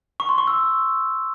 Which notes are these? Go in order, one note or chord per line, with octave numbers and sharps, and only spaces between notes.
C#6
C6
C#6
E6